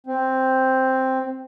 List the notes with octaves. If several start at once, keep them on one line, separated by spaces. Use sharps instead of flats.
C4